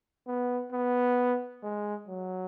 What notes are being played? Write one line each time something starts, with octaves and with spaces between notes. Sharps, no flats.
B3
B3
G#3
F#3